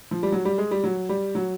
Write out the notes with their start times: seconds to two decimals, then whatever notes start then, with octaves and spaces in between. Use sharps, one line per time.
0.11 F3
0.23 G3
0.32 F#3
0.45 G3
0.58 G#3
0.71 G3
0.84 F#3
1.09 G3
1.35 F#3